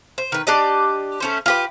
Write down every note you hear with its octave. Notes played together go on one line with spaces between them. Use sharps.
C5
D#3 B4
D4 G4 D5 D#5
A3 C#4 C5
F4 G4 B4